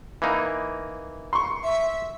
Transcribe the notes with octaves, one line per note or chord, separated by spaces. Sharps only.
E3 A#3 D#4
C6 C#6
E5